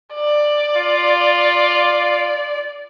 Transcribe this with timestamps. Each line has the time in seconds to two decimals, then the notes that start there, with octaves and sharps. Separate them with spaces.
0.14 D5
0.77 F4